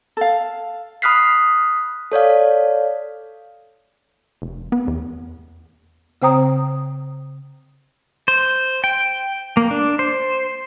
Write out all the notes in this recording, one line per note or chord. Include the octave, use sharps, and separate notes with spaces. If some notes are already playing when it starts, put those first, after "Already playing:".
A4 F5
B5 D#6 F6 F#6 B6 C7
A4 C#5 D5 F5
F1
B3
E2
C#3 C4 C5 G5 A#5 D#6
C5
G5
A#3
D4
C5